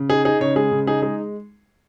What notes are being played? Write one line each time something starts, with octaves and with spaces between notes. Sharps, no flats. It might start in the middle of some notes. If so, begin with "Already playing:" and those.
Already playing: C#3
D#4 G#4
D#4 G#4
C#3 C#5
G#3 G#4
C#3
D#4 G#4
G#3 G#4